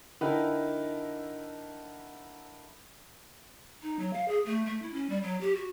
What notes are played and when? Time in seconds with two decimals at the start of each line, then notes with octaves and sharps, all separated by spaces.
0.21 D3 D#4 E4 A#4 B4 G5
3.83 D#4
3.99 F#3
4.13 F5
4.28 G#4
4.45 A3
4.66 A3
4.82 E4
4.93 C#4
5.09 G3
5.23 F#3
5.41 G4
5.55 F#4